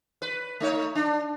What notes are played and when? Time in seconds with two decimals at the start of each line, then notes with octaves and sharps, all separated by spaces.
0.22 B4
0.60 A3 D#4 C#5
0.95 D4